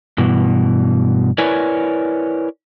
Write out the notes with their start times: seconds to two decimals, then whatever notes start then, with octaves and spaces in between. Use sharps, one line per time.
0.18 G2 B2 E3
1.38 E4 A#4 B4 C#5 D5 G#5